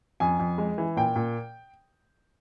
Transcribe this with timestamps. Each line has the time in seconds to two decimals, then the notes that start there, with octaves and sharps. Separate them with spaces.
0.20 F2 G#5
0.39 F2
0.58 G#3
0.78 E3
0.97 A#2 G5
1.16 A#2